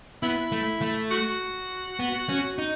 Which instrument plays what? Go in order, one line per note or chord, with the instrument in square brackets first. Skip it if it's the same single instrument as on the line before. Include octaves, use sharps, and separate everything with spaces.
[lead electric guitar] B3 [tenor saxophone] E4
[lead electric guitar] A3
A3
[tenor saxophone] F#4
[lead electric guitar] B3
C#4
D#4